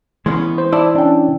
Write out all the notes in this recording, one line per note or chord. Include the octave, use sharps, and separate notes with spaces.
E3 G#3 B3 C#4
C5
E4 D5 A5
C#4 D4 G5